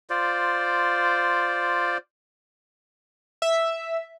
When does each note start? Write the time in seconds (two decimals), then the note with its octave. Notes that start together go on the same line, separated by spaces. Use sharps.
0.10 F4 C5 D5
3.42 E5